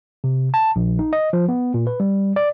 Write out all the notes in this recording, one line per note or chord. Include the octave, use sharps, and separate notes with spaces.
C3
A5
A#1
D#4
D#5
F3
B3
A#2
B4
G3
D5